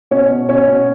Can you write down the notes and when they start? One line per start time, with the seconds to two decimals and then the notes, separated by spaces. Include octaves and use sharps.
0.11 B2 C#4
0.30 B2
0.49 B2 C#4
0.68 B2